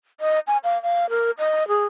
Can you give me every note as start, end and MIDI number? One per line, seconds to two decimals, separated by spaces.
0.21 0.40 75
0.47 0.58 80
0.64 0.81 77
0.83 1.09 77
1.10 1.31 70
1.38 1.67 75
1.68 1.86 68